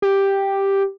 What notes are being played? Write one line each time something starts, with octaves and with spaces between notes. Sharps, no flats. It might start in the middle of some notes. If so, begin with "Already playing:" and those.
G4